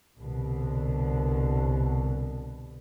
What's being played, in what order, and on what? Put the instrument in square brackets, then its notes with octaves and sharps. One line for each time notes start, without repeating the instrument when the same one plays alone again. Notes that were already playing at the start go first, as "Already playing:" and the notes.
[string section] C2 B2 D3